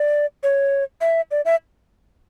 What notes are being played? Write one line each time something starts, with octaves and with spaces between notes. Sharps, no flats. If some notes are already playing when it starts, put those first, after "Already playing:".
Already playing: D5
C#5
E5
D5
E5